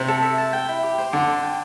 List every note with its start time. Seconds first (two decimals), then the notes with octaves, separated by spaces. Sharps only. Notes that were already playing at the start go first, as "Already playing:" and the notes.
Already playing: C3
0.08 A4
0.22 E5
0.38 A5
0.53 G5
0.69 E4
0.83 G4
0.98 C5
1.12 D3 D6
1.28 D5
1.43 G5